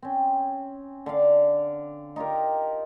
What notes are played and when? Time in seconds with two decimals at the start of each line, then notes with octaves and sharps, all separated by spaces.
0.02 C4 C#4
1.06 D3 D5 F5
2.16 D#4 F4 G4 A#4